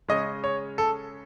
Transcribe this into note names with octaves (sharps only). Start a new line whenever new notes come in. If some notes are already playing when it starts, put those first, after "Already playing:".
C#3 G#3 C#4 D#5
C#5
A4